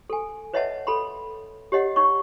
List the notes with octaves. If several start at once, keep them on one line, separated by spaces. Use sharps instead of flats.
A4 G#5
B4 C#5 D#5 E5 F#5 A5
A4 B5 C6
G4 C#5 D#5 F#5
D#4 C#5 C#6